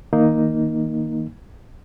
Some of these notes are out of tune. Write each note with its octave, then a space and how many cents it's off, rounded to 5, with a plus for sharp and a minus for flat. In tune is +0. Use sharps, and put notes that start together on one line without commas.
D#3 +15 A#3 +0 D#4 +0